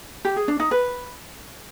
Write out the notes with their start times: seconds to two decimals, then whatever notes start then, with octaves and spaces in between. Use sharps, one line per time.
0.25 G4
0.36 G#4
0.48 D4
0.60 D#4
0.71 B4